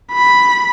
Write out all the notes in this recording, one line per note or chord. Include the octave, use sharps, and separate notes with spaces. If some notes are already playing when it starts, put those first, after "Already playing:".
B5